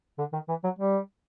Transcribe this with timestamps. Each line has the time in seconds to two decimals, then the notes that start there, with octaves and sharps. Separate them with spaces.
0.19 D3
0.33 D#3
0.49 E3
0.64 F#3
0.79 G3